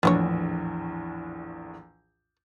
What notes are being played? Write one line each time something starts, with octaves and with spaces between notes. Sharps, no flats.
A#1 E2 A2 B3 D4 C#5